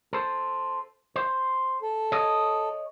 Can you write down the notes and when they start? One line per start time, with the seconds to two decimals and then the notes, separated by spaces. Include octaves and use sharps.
0.13 A4 C5
1.16 C5
1.82 A4
2.12 C#5 D#5